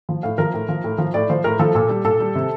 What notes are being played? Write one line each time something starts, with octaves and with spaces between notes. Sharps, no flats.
F3
A2 F5
F3 A#4
A2
F3
A2
F3
A2 D5
F3 C5
A2 A#4
F3 A4
A#2 A4
G3
A#2 A4
G3
C3